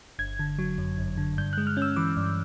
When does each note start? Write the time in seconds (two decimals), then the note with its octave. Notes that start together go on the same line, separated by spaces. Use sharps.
0.19 G1 G#6
0.39 D3
0.59 F#3
0.78 F#2
0.98 G1
1.17 D3
1.38 G2 G6
1.53 G#3 F#6
1.67 F6
1.77 C#4 E6
1.96 E3 D6
2.17 G2